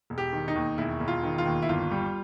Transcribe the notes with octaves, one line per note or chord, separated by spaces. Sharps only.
E1
G4
D#3
D#4
D#2
E1 E4
E1
F4
D#3
F4
D#2
E4
G1 F4
G3